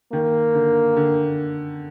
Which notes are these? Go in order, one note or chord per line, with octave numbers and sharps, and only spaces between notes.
D#3 A#3
D3
D3